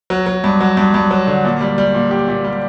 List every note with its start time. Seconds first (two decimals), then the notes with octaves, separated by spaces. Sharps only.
0.10 F#3
0.26 F#3
0.44 G2
0.61 F#3
0.77 G2
0.94 G2
1.11 F#3
1.27 D3
1.44 A#2
1.61 G3
1.78 G3
1.94 A#2
2.11 G4
2.28 A#2
2.44 G3